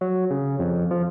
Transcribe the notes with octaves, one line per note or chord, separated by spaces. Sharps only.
F#3
C#3
F2
F2
F3